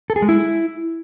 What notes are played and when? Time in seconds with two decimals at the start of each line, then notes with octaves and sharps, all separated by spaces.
0.10 A4
0.16 G#4
0.22 G#3
0.29 E4